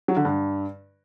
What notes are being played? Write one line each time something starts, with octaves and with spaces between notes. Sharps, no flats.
F#3
D3
G2